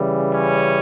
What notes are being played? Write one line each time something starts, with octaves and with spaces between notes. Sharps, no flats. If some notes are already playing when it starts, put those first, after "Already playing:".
Already playing: C#3 E3 G3
C#4